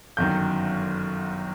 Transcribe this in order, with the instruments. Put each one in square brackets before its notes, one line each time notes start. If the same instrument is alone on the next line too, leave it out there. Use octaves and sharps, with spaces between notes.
[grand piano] G1 F#2 D#3 G6